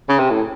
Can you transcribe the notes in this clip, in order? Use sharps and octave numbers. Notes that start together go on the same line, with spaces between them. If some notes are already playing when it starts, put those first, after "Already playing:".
C#3
C3
A2